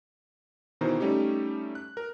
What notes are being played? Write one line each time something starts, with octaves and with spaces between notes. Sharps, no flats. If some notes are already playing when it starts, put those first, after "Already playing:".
B2 D#3 E3 C5 A#5
G3 A3 C#4 D#4 G4
F#6
A#4